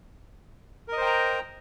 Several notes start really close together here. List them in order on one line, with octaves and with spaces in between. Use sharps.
A#4 D#5 C5 G5 A#5